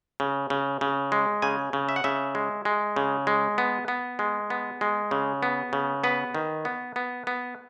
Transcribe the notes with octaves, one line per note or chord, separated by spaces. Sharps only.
C#3
C#3
C#3
G#3
C#3 G#5
C#3
E5
F#5
C#3 E5
G#3
G#3
C#3
G#3
B3
B3
G#3
B3
G#3
C#3
B3
C#3
B3 B4
D#3
B3
B3
B3